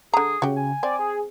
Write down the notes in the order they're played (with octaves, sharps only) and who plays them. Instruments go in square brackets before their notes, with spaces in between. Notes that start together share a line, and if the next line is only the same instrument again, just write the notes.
[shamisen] D3 A#5 [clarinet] G#4
[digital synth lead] C#3 [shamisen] F#4 G4
[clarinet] G#5
[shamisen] C4 [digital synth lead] D5
[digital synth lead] G#4